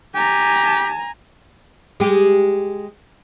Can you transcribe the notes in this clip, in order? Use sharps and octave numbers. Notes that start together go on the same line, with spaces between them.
G4 G#5 A#5
G#3 G4